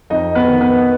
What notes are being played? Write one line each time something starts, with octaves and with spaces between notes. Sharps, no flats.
F2 D#4 D#5
B3 B4
D#3
B3 B4